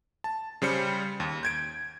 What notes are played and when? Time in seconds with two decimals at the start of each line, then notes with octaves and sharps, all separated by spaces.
0.24 A5
0.62 C#3 G3 C5 C#7
1.20 D#2
1.43 G6 G#6 D7